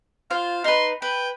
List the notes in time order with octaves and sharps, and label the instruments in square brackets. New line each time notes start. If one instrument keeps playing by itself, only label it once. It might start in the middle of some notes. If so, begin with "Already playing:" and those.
[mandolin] F4 C5 [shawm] F5
[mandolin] D#4 B4 [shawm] C6
[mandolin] B4 [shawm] G5